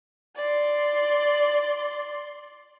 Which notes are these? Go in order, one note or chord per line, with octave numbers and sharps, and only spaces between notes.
D5 C6